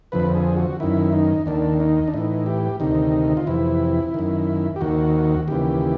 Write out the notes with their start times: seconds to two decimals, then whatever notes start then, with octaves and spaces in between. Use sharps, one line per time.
0.12 F2 D3 F3 B4
0.35 G#4
0.57 F#4
0.80 F#2 D#3 E4
1.12 D#4
1.46 D#2 D#3 D4
1.80 D#4
2.08 D4
2.14 A2 E3 D#4
2.46 G4
2.80 D2 C3 D#3 D#4
3.37 F4
3.47 F2 C3 E3 E4
4.14 F#2 D#3
4.76 G4
4.81 D#2 D#3 F#4
5.48 D#2 C#3 E3 G4